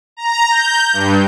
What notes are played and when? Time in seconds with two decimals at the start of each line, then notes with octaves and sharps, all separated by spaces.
0.17 A#5
0.51 G6
0.93 G2